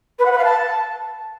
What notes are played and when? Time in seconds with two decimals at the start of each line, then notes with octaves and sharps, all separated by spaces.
0.19 B4
0.25 F#5
0.32 B4
0.38 F5
0.44 A5